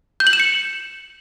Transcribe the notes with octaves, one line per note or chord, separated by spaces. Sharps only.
G6
F#7
E7
C#7